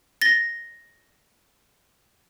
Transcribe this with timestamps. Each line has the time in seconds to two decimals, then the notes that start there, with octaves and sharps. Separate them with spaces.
0.21 A6 A#6 G7